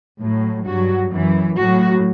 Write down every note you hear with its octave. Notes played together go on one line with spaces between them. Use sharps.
A2 F#3
G2 F#3 F#4
F#2 E3
A2 F#3 F#4